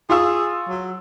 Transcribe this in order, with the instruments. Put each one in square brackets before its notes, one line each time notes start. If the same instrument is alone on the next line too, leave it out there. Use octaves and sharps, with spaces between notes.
[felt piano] F4 C#6 E6 [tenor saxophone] G#4
[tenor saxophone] F#3